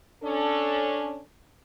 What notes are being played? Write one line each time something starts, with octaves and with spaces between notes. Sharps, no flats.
C#4 D4 A4